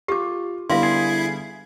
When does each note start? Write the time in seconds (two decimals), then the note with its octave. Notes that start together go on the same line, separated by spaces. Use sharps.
0.08 F4 G4 D6
0.70 D3 G3 B3 E4 E5 F5 C6
0.83 G#4